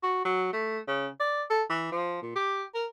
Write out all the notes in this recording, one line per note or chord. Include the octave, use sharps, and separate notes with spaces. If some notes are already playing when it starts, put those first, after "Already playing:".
F#4
F#3
A3
C#3
D5
A4
E3
F3
A#2
G4
A#4